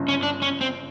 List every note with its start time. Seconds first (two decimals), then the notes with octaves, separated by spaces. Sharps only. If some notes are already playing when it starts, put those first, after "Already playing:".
Already playing: G1 F#2 C#3
0.08 C#4
0.23 D4
0.42 C#4
0.61 C4